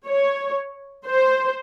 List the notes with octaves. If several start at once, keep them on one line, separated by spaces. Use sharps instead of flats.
C#5
C5